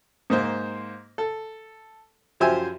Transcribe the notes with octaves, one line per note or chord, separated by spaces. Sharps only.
G#2 A#3 C5
A4
F#2 F3 G4 C5 E5 G#5